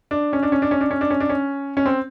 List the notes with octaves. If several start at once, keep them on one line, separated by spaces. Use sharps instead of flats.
D4
C#4
D4
C#4
D4
C#4
D4
C#4
D4
C#4
D4
C#4
C#4
C4